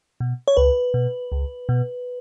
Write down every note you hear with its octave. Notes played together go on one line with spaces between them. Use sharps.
B2
C#5
C#2 B4
B2
C#2
B2